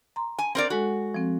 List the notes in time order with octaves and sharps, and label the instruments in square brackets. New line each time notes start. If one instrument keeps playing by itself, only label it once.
[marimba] A#5 C6
[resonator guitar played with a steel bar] G#5
C4 A#4 D5
[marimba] G#3 A4 [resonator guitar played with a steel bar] F#4
[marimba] F3 C4